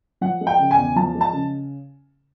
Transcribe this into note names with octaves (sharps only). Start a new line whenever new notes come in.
F3 F#5
G#3
G5
C#3
G#5
E2
F3 A5
G#3
A5
C#3